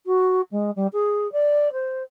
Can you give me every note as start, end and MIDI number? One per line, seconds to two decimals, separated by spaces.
0.06 0.41 66
0.51 0.71 56
0.76 0.87 55
0.93 1.30 68
1.32 1.72 74
1.72 2.03 72